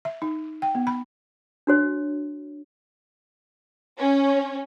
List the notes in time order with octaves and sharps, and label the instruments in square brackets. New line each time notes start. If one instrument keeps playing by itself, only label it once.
[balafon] E5
D#4
G5
B3
B5
[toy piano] D4 F#4 C#5
[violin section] C#4